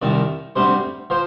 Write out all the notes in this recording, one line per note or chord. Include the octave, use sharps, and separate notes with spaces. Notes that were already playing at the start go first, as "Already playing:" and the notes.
C2 C3 D#3 D5
D2 C3 G3 C5
F3 C5